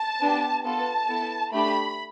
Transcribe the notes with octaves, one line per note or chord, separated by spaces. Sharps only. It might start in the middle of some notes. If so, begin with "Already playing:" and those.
Already playing: A5
B3 D4 G4
B3 F4 A4 A5
B3 E4 A4
A3 D4 G4 B5